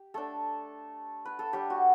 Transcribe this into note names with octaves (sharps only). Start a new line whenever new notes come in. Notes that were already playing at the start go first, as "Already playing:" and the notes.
Already playing: G4
A3 D4 A4
B4
A4
G3 D4 G4
F#4